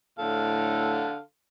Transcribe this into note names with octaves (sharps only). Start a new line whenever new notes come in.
A2 D3 A4 F5